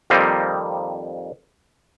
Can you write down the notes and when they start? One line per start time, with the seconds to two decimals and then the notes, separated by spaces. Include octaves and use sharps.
0.10 F2 D#3 G3 A#3 C4 D#4